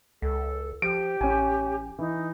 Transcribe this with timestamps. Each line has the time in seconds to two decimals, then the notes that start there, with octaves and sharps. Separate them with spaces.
0.22 C#2 A4
0.82 F3 G4 D7
1.21 A1 C#4 G#5
1.99 E3 D#4